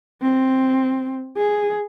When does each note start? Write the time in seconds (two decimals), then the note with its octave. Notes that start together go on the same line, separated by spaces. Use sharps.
0.22 C4
1.37 G#4